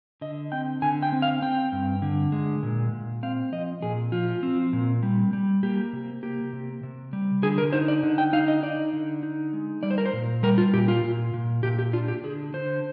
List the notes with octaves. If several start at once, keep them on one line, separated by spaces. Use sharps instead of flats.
D3 D#5
C4 G5
D3 G#5
G5
C4
F5
C4 G5
G2
D3
G#3
A#2
A#2
C4 F5
F3 D#5
A#2 G#4
F3 F4
C4
A#2
G3
G3
A#3 G4
C3
A#3 G4
C3
C3
G3
D3 G#4
A#4
D#4 C5
D5
D3
G5
D#4 F5
D#5
D#4 D5
D3
D#4
G#3
G3 D5
C5
A#4
C5
A#2
G3 A#4
F4
A#2 G4
F4
A#2
A#2
A#2 G4
G4
D4 F4
G4
D3 G#4
D3 C5